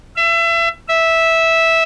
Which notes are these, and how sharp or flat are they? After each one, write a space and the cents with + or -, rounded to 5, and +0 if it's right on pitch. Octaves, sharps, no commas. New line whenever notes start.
E5 +30
E5 -10